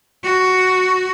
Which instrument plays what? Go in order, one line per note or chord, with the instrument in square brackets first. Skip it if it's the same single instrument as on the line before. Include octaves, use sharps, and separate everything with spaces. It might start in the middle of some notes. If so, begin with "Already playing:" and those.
[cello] F#4